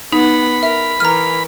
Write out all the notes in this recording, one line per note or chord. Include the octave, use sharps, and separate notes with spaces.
B3 D#4 F#5 B5
A#4 E5
E3 A#4 A#5 F6